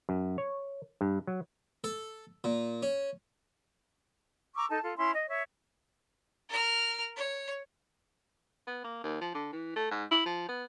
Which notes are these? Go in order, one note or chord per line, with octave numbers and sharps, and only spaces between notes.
F#2
C#5
G2
F#3
A4
A#2
C#4
A#5 C#6 D6 E6
D#4 A4 A5
F4 A4
C#4 E4 C6
D#5
C#5 E5 C#6
A#4 F6
C#5
B3
A#3
D#2
F3
D3
E3
A3
G#2
E4
F3
B3